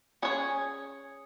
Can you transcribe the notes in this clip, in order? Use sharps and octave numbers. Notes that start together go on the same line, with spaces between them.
C#4 G#4 C#5